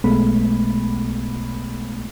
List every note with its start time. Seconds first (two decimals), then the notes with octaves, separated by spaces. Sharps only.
0.04 B1 B2 G#3 A3 B3 B5